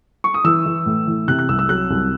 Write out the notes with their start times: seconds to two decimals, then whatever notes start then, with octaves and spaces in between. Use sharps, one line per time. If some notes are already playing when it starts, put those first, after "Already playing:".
0.24 C#6
0.34 D#6
0.44 E3 E6
0.66 E3
0.86 A2
1.07 E3
1.28 C3 F#6
1.39 F#6
1.49 C2 E6
1.59 E6
1.69 F#3 F#6
1.90 C2